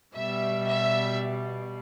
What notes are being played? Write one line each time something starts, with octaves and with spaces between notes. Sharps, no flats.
B2 G3 E5
E5